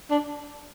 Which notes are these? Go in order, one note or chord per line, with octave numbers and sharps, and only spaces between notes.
D4